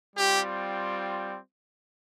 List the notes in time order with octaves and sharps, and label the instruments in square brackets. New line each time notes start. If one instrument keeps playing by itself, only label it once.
[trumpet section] G3 C4 F4 G4